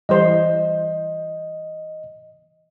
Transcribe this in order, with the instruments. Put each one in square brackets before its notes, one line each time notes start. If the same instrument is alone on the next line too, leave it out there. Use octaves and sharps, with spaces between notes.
[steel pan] E3 G3 C5 [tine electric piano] D#5